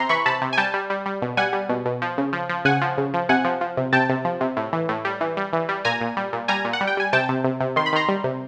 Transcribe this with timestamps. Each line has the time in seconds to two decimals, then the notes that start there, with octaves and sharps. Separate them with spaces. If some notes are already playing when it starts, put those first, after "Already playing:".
Already playing: C3 A#5 C6
0.09 E3 B5 C#6
0.26 C3 A5 B5
0.42 C3
0.53 G#5
0.57 G3 G5 A5
0.74 G3
0.90 G3
1.06 G3
1.22 B2
1.37 G3 F#5 G#5
1.53 G3
1.69 B2
1.85 B2
2.02 F3
2.18 C#3
2.33 F3
2.49 F3
2.65 C#3 F#5 G#5
2.82 F3
2.98 C#3
3.14 F3
3.29 C3 F#5 G#5
3.45 F3
3.61 F3
3.77 C3
3.93 C3 G5 A5
4.09 C3
4.25 F3
4.41 C3
4.57 A2
4.73 E3
4.89 A2
5.05 G3
5.21 E3
5.37 G3
5.53 E3
5.69 G3
5.85 A#2 G#5 A#5
6.01 A#2
6.17 G3
6.33 A#2
6.48 G3 G#5 A#5
6.65 A#2
6.73 F#5
6.81 G3
6.87 G5
6.97 G3 G#5
7.13 C3 G5 A5
7.29 C3
7.44 C3
7.60 C3
7.76 D#3 C6
7.86 B5
7.93 D#3 A#5 C6
8.09 G3
8.24 C3